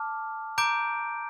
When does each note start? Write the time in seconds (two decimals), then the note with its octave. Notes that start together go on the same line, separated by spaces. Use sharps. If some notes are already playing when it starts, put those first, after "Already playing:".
Already playing: A5 D6 F6
0.58 A#5 D6 G6 D7